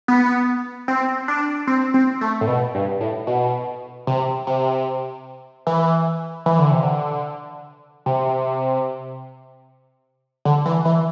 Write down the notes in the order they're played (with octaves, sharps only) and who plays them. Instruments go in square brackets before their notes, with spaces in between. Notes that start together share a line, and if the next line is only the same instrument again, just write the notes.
[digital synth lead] B3
C4
D4
C4
C4
A3
A2
B2
G2
A2
B2
C3
C3
E3
E3
D3
C3
D3
C3
D3
E3
E3